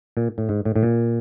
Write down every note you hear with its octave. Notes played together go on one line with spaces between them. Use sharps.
A#2
A2
G#2
A2
A2
A#2